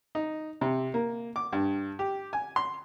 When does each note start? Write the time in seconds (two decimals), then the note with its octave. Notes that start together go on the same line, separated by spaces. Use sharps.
0.15 D#4
0.61 C3
0.94 A#3
1.36 D6
1.53 G2
1.99 G4
2.33 G#5
2.56 C6